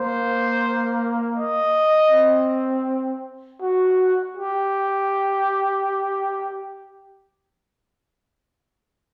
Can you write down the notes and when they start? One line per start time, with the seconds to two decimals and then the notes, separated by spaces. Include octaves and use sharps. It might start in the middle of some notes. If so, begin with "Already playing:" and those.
Already playing: A#3 C5
1.36 D#5
2.11 C4
3.61 F#4
4.37 G4